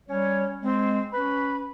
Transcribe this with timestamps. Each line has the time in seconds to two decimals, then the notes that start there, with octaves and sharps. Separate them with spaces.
0.09 G3 C#4 C#5
0.62 G#3 C4
1.13 C#4 B4 B5